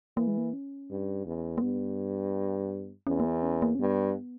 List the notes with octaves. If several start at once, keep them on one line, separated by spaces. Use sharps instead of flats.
E3 A#3
G#3
A#3
C#4
G2
E2
A#3
G2 B3
E2 C#4
A#3
B3
C#4
A#3
C#4
G2 B3